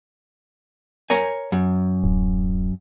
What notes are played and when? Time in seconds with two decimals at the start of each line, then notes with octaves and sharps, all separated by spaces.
1.10 A#4 C#5 G#5
1.52 F#2
2.04 D1